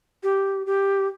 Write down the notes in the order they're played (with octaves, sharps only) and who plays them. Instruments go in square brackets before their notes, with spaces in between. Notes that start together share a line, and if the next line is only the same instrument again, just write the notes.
[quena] G4
G4